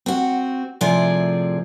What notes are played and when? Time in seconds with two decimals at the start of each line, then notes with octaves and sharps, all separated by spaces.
0.06 C4 F#4
0.81 A2 C3 F3 G#4 D5